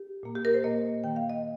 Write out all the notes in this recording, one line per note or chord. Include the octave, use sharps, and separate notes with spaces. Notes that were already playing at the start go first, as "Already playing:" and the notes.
Already playing: G4
A#2 A#3
G4
A#4
C5
A#2 A#3 D#5
D#3 A#3 G5
F5
D#5